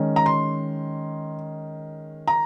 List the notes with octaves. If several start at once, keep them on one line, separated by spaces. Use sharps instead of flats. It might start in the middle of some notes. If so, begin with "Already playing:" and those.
Already playing: D#3 G#3 C#4
A#5
C6
A#5